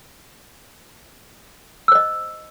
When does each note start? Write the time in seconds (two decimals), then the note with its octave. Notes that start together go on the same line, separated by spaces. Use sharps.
1.88 E6
1.92 C5
1.95 D#5